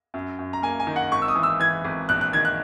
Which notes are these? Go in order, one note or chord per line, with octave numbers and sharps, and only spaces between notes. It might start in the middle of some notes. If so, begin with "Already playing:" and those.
F#2
F#2
A#5
A#3 G#5
G#5
D#3
F#5
G#1 C#6
E6
D#6
E3
E6
E3 G#6
G#1
A#1 F#6
F#6
D#3 G#6
F#6